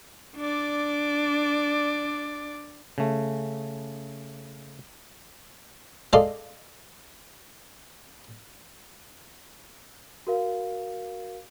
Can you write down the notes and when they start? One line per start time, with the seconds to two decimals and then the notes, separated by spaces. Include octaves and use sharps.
0.36 D4 D5
2.98 C#3 A3
6.13 G#3 F4 A4 D5 D#5 F5
10.27 F#4 A#4 F5